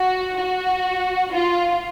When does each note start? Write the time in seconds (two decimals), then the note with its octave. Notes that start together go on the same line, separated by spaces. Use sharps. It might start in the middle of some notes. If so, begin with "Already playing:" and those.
Already playing: F#4
0.37 F#4
1.32 F4